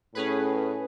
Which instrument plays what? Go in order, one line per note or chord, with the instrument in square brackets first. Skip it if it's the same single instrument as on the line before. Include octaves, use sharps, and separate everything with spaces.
[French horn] A2 [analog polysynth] C#4 G#4 B4